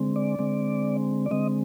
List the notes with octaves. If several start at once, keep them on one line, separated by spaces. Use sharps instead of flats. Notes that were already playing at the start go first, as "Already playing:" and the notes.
Already playing: D3 G#3 C4
D5
D3 G#3 C4
D5
D3 G#3 C4 D#5